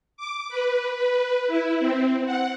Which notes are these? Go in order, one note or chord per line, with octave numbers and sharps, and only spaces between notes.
D6
B4
B4
E4
C4
F#5